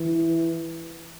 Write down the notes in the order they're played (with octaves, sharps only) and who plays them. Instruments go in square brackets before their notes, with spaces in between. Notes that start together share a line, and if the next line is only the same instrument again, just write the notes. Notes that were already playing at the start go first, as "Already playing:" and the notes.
Already playing: [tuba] E3